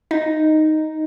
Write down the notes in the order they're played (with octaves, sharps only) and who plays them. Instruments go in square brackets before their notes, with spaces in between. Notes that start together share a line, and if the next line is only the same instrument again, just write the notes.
[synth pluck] D#4